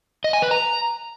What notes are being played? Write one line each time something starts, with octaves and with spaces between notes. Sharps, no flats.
D#5
G#5
B4
A#5